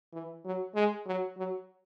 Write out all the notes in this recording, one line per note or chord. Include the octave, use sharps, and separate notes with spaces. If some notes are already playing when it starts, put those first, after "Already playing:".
E3
F#3
G#3
F#3
F#3